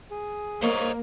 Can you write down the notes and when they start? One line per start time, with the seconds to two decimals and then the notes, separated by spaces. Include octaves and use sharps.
0.11 G#4
0.63 A#3 C5 C#5 D#5